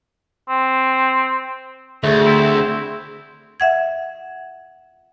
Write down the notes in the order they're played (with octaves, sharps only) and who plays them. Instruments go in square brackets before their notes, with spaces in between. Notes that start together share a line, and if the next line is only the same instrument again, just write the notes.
[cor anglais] C4
[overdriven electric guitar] D2 [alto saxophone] A3 [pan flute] G#4
[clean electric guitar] C4 E4
[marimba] E5 F#5 G#6